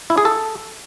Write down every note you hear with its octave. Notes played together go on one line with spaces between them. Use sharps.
E4
G#4
A4